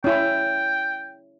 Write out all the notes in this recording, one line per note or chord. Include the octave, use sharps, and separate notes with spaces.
C#4 E4 G5